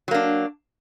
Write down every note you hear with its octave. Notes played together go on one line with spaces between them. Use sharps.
F#3 A#3 D4